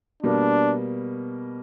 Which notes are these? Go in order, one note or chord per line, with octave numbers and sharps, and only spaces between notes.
B2 G3 A#3 D4